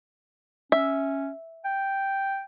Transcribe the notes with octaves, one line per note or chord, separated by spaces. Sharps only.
C#4 E5
G5